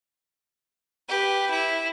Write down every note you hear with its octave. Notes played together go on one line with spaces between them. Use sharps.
G4 B4
E4